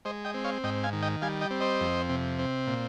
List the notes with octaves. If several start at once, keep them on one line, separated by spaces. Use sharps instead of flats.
G#3 C5 D#5
D#5 G5
C4
C#5 F5
G#2 D#5 G5
F5 G#5
D#3
D#5 G5
G3 F5 G#5
D#5 G5
C4
C5 D#5
F2
C3
C4
A#2